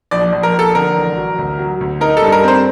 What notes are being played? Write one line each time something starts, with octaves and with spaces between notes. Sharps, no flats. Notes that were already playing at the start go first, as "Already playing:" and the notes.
A#1 D5
A#1
A#4
A#1
A4
D3 A#4
A1
F#3
D2
F#3
D2
D#4 A#4
A4
G2
A#4
C4 C5